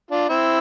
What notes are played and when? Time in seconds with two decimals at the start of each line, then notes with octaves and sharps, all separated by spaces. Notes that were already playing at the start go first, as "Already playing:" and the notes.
0.11 D4 F4
0.29 C4 E4